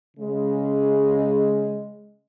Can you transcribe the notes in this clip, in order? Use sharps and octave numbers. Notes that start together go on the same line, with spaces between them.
C#3 G#3